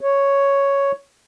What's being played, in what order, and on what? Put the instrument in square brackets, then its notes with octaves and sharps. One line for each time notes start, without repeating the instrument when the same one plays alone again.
[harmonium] C#5